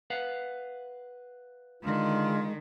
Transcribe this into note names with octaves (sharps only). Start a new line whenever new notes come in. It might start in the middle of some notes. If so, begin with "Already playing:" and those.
B4 F5 F#5
D3 D#3 G#3 F4